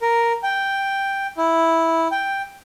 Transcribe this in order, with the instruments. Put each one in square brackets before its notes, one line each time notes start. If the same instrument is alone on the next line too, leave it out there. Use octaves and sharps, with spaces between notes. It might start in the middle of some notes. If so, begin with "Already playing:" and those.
[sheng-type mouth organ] A#4
G5
E4
G5